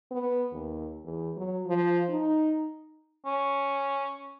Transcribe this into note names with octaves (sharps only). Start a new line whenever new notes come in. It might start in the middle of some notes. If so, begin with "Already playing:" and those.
B3
D#2
E2
F#3
F3
D#4
C#4